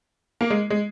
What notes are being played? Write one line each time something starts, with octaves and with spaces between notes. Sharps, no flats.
A#3
G#3
G#3